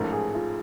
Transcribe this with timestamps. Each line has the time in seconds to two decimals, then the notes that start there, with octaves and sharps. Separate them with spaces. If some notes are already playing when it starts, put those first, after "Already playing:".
Already playing: A1 G#2 F3 A3 A#4
0.13 G#4
0.35 F4